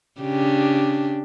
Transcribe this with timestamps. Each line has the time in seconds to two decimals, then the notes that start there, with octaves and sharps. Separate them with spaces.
0.21 C#3 D4 G4